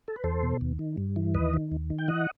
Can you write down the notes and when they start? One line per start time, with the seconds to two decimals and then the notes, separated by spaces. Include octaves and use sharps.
0.08 A4
0.16 B4
0.24 E2 A4 C5
0.43 B2
0.61 D#2
0.79 D#3
0.98 G2
1.16 E3
1.34 D#2 B4 D#5
1.53 D#3
1.72 D#2
1.90 D#3
1.99 G5
2.08 E3 D#5 F#5